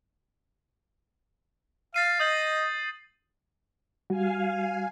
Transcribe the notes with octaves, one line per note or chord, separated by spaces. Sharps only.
F5 A6 C7 D#7
D#5 D#6 G6 F#7
G3 F#4 F5 G#5